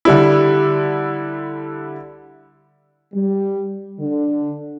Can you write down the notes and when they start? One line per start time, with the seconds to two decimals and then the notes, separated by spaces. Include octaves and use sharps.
0.05 D3 G3 E4
3.14 G3
4.00 D3